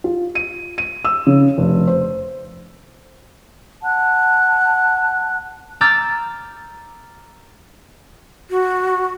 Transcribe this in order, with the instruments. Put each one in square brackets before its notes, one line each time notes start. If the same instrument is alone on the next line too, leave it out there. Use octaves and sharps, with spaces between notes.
[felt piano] F4
D#7
D#7
E6
C#3
F1
C5
[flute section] F#5 A5 F#6
[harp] A#5 D6 E6 F6 G6 A6
[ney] F#4